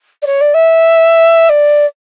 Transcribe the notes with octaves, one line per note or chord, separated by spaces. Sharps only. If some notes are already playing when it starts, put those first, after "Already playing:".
D5
C#5
D5
E5
D5